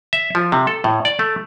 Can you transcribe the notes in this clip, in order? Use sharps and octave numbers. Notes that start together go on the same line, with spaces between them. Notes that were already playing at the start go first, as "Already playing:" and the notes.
E5
F3
C3
A4
A2
D5
A3